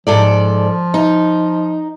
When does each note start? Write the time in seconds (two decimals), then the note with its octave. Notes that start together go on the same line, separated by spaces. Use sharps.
0.07 G#2 F3 A4 D5
0.94 D#4